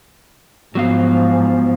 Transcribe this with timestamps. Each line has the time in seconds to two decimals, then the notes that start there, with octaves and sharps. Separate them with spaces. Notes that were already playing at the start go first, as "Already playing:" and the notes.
0.75 G#2 F3 F#3 B3 F5